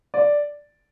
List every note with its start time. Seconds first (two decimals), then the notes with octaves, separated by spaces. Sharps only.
0.14 D5